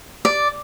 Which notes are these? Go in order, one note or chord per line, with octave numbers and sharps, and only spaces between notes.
D5